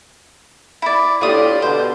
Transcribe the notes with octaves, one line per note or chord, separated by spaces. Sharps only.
E4 D5
A2 D4 F4 G4 D5 D#6
B2 D3 C5